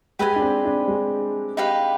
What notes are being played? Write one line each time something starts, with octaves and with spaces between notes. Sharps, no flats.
G#3 G4 B4 D#5 G#5
D4
C4
D4
G#3
D#4 G4 B4 F5